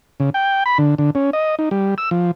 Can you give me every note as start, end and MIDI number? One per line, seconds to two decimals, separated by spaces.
0.20 0.30 49
0.34 0.64 79
0.66 0.78 83
0.78 0.95 50
0.98 1.10 50
1.15 1.30 61
1.33 1.55 75
1.59 1.69 63
1.71 1.95 55
1.98 2.10 88
2.11 2.31 53